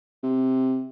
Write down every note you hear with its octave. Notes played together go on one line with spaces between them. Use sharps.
C3